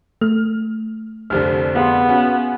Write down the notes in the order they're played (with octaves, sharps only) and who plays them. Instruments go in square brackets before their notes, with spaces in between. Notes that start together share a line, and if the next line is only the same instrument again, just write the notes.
[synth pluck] A3 [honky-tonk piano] F6
[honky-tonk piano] F1 C2 D3 [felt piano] C5 F6
[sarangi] B3 [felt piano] G#4 F5 C6
[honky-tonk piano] C#4 F#4